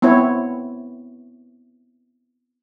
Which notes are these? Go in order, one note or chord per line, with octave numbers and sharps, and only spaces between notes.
B3 C4 E4 C#5